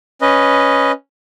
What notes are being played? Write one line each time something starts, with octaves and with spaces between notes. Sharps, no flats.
C#4 B4 D#5